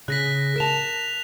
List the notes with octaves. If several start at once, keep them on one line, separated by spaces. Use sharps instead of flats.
C#3 G#4 F#6 A#6 B6
A#4 A5 A#6 E7 F7